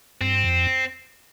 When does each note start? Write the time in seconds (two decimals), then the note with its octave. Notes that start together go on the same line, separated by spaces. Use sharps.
0.21 G2 C4
0.44 F2